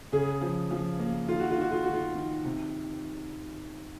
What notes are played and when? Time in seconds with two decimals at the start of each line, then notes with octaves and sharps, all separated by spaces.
0.12 C#3 G#4
0.41 F3
0.71 F3
0.99 A#3
1.29 D#3 F4
1.40 F#4
1.51 F4
1.58 D#3 F#4
1.72 F4
1.84 D#3 F#4
1.94 F4
2.15 D#3
2.45 C3